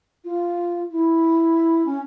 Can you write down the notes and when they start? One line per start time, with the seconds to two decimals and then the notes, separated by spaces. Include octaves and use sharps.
0.24 F4
0.91 E4
1.86 C#4